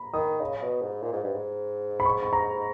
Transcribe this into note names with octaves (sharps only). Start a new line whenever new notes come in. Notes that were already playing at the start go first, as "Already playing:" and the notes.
Already playing: A#5 B5
D#3 D#6
C#3
C#3
B2
G#2
A#2
G#2
G2
G#2
B5
C#6
B5
A#5